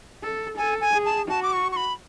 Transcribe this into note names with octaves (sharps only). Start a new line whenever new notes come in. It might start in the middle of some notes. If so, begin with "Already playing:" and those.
A4
A4 G#5
G#5
G#4
A5
F#4 A5
D6
C#6
C#6
B5